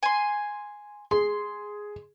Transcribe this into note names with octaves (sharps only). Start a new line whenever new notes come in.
G#5 C6
G#4 C6